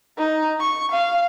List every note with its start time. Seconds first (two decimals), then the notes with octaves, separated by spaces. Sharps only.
0.18 D#4
0.61 C#6
0.92 F5